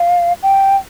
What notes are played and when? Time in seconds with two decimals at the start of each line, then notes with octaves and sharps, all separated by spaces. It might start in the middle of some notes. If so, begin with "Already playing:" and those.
Already playing: F5
0.43 G5